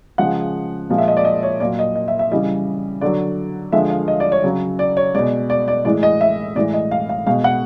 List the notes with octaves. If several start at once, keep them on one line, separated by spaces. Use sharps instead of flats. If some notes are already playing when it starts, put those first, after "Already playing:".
C#3 F3 G#3 F#5
A#2 F3 G#3
E5
D#5
D5
D#5
C#5
A#2 F#3 D5
D#5
D#5
E5
E5
C#3 E3 G3 D#5
D3 F#3 D5
D3 F3 G#3 E5
F5
D#5
D5
C#5
C#3 F#3
D5
C#5
B2 G#3 D5
D5
D5
A2 E3 G#3 D5
D#5
E5
A2 E3 G#3 D5
D#5
F5
F5
B2 G#3 F5
F#5